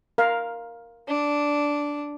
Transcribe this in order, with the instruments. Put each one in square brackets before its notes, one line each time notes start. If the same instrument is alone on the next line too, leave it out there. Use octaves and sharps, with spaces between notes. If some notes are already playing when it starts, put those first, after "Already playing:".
[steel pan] A#4 F5
[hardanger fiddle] D4